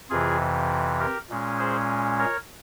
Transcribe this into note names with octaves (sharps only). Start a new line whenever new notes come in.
F2 C3 E3 F4 G#4
G4 A#4
A#2 G#3 C#4
G#4 C5
A#4 C#5